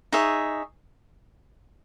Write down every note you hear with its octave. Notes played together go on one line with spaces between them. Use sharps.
D#4 G#4 C#5 E5